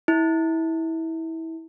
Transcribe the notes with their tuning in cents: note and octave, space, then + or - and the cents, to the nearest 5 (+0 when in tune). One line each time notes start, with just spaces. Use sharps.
E4 -25